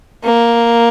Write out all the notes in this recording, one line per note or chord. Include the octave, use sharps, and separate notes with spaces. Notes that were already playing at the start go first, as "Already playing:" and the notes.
A#3